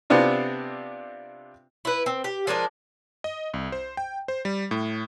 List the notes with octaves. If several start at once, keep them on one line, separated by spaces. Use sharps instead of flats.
C3 B3 C4 D4 F4
E4 B4
C4
G4
F3 G#3 D4 A#4
D#5
C2
C5
G5
C5
G3
A2